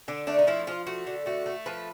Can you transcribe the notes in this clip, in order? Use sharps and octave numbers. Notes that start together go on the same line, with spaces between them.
D3 D4
A3 D4
D#4
F3 E4
F3 F4
A3 F#4
D3
A3 F#4
A3
F3 B4